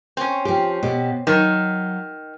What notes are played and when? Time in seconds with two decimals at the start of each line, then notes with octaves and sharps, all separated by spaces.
0.17 C4 C#4
0.45 F3 G4
0.83 B2 G4
1.27 D#3 F#3